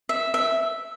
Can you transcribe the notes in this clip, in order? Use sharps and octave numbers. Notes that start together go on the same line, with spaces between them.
E5
E5